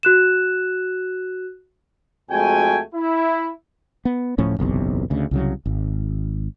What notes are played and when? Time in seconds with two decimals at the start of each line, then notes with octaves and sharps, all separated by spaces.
0.03 F#4 F#6 E7
2.31 F2 G#3 A3 F#4 G5 G#5
2.94 E4
4.05 B3
4.38 D1 A2 F3 C#4
4.59 F#1 B1 E2 C3
5.10 D2 C#3
5.31 C2 C#3 F#3
5.66 G#1